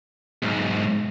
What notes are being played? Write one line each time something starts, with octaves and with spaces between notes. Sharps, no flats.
B1 G#2